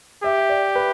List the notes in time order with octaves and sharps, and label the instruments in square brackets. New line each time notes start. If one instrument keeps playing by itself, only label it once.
[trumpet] G4 [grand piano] E5
[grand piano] D5
B4